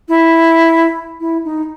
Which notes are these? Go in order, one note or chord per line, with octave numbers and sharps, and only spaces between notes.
E4
E4
D#4